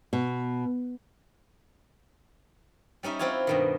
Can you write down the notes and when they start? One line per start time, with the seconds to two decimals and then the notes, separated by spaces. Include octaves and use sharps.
0.13 B2
3.03 G3 C#4 D#4 E5
3.19 C4 E4 F4 G4 C#5
3.47 G2 B2 D#3